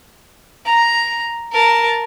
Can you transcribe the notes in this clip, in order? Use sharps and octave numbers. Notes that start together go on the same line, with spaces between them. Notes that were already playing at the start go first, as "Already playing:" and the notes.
A#5
A#4 A5